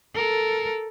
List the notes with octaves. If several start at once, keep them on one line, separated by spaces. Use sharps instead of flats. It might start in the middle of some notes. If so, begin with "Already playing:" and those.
A4 A#4